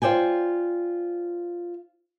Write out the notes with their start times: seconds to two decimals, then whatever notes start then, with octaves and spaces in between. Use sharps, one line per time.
0.02 F4 C5 D5 G5 G#5